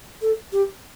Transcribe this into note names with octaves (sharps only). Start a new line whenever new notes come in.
A4
G4